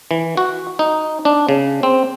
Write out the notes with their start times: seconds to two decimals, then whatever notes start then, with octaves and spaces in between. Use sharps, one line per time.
0.11 E3
0.37 F#4
0.79 D#4
1.25 D4
1.49 C#3
1.83 C4